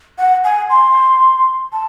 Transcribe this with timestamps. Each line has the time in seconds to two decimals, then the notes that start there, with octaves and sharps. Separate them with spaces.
0.18 F#5
0.44 G#5
0.70 C6
1.73 A5